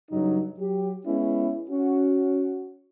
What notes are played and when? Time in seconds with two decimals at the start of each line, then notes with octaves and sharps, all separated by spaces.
0.11 G2 C#3 F#3 D#4
0.58 F#3 G4
1.06 G#3 B3 C#4 E4
1.70 C#4 F#4